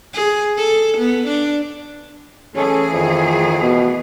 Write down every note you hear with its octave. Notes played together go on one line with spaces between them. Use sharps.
G#4
A4
B3
D4
E3 A3 C#4 G#4 A4
F2 D#3
B2 B3